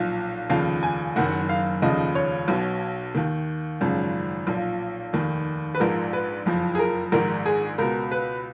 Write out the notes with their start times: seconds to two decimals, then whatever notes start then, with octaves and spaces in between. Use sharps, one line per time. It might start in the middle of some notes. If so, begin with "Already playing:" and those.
Already playing: B1 A#2 F3
0.50 F1 D#2 C#3 F3 F5
0.83 G#5
1.16 F#1 F#2 D#3 F#5
1.49 F5
1.82 F1 D#2 C#3 F3 D#5
2.15 C#5
2.48 B1 B2
3.15 D#2 D#3
3.81 G#1 F#2 C#3 F3
4.47 B1 A#2 F3
5.13 F1 D#2 D#3
5.75 B4
5.80 A#1 G#2 F3 A#4
6.13 B4
6.46 F#1 F2 F3
6.75 G#4
6.79 A#4
7.12 A#1 G#2 D#3 A#4
7.46 G#4
7.78 C#2 B2 A#4
8.12 B4